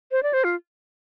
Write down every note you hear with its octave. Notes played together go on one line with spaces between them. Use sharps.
C5
D5
C5
F4